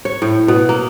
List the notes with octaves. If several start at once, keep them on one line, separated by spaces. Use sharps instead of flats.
C#5
A2
B2
A#3